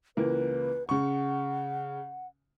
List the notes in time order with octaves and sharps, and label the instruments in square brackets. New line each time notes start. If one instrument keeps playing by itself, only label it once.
[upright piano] C#2 E3 A#3 [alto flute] B4
[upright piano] C#3 C#6 [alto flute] F#5